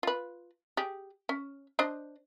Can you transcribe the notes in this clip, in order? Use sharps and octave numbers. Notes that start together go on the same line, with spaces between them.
F4 B4
G4 G#4
C#4
D4 C5 D#5